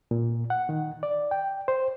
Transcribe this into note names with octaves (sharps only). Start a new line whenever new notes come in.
A#2
F#5
D#3
D5
G5
C5